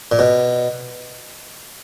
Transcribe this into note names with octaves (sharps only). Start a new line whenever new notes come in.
A#2
B2